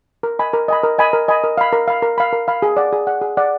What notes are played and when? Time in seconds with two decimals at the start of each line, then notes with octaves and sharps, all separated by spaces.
0.23 A#4
0.39 D#5 G#5 B5
0.53 A#4
0.68 D#5 G#5 B5
0.83 A#4
0.98 D#5 G#5 B5
1.13 A#4
1.28 D#5 G#5 B5
1.44 A#4
1.58 F5 B5
1.73 A#4
1.88 F5 B5
2.02 A#4
2.18 F5 B5
2.33 A#4
2.48 F5 B5
2.62 G#4
2.77 D5 F#5
2.93 G#4
3.07 D5 F#5
3.21 G#4
3.37 D5 F#5